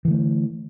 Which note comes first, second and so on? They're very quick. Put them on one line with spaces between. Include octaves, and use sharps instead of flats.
E3 D3 A3